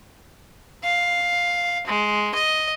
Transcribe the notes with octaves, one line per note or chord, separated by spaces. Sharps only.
F5
G#3
D#5